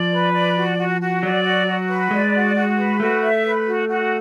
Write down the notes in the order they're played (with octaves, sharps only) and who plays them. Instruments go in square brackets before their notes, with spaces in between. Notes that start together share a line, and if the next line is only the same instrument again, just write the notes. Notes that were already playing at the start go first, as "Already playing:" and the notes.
Already playing: [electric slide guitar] F3 [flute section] D5
[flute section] B4
D5
F#4
F#4
F#4
[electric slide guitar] F#3 [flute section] D5
[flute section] F#4
F#4
B4
[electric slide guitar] G#3 [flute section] D5
[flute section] F#4
F#4
B4
[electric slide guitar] A3 [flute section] F#4
[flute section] E5
B4
F#4
F#4